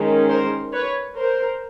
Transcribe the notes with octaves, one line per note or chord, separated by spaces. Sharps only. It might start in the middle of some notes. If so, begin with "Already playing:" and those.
Already playing: D#3 G#3 C#4
A#4 C5
B4 C#5
A#4 C5